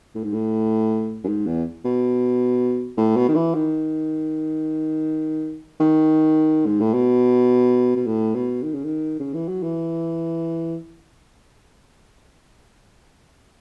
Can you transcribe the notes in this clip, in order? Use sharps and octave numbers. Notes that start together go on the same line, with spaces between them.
A2
G#2
A2
F#2
G#2
E2
B2
A2
B2
D#3
E3
D#3
D#3
G#2
A2
B2
B2
A2
B2
D#3
C#3
D#3
C#3
E3
F#3
E3